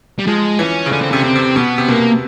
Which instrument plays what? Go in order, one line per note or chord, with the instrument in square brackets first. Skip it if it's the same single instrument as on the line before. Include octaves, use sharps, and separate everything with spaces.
[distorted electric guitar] G3
[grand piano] F3 [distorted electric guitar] G#3
[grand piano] E3 [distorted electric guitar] C#4
[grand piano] C#3
[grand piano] D3 [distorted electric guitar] C#4
[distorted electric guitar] C4
[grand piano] C3 [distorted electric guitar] C#4
[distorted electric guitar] C4
[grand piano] C3
[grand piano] B2 [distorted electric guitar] B3
[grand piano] C3
[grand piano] B2 [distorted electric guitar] A#3